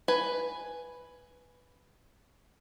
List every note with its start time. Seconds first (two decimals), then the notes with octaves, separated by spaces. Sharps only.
0.08 B4 G#5